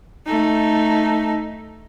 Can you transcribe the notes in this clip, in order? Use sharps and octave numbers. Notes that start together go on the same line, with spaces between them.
A3 D#4